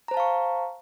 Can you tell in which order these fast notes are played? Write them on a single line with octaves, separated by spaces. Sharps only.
A#5 C5 A5 F5 C#6